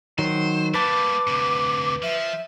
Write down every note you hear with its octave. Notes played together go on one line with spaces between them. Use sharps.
D#3 F#3 C5
G3 A#3 B4 A5 D6
D2 C3
F3 E5